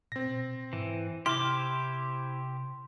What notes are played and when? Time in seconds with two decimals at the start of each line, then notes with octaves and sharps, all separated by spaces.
0.12 A#2 C4 A#6
0.27 B2
0.73 G#2 E3
1.26 C3 E4 G4 C5 C6 D6 F6